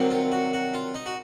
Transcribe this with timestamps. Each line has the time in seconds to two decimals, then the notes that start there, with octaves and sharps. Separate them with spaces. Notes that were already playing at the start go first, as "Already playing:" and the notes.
Already playing: C2 C3 D#3 F#3
0.10 F4
0.32 F#4
0.53 F#4
0.74 F4
0.94 D#4
1.06 F#4